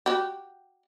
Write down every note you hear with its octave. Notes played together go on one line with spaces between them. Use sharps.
F#4 G4